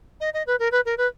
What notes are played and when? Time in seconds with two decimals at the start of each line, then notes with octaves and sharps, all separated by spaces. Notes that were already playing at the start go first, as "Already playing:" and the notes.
0.21 D#5
0.34 D#5
0.47 B4
0.59 A#4
0.72 B4
0.85 A#4
0.98 B4